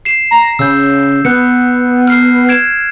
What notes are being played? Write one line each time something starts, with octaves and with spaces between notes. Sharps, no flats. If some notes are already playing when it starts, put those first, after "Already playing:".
C7 E7
A#5
C#3 E6 G6
B3 F#6 C#7
F6 C7
G#6 D7 E7